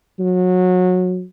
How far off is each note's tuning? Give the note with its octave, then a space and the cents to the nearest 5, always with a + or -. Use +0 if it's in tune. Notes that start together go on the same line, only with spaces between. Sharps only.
F#3 -20